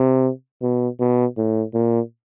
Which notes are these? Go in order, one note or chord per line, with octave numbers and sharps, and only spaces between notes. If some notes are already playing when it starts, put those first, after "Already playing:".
Already playing: C3
B2
B2
A2
A#2